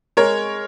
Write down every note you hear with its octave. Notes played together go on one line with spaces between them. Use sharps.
G#3 A#4 C#5